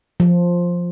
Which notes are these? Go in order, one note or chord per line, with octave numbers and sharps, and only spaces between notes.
F3